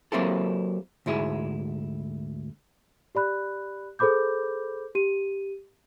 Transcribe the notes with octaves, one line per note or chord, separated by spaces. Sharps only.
F#3 A#3 C4 E4 G4 A4
D2 G#2 E4 G#4
G4 D5 B5 F#6
G#4 A4 C5 B5 D6 G6
G4 D#7